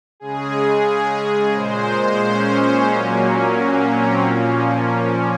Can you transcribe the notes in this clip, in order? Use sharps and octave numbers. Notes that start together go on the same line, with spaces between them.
C#3 G#3 G#4
A#2 G#3 C5
C#4
A#2 F#3 A#3
C#4
C4
A#2 F3 A#3 C#4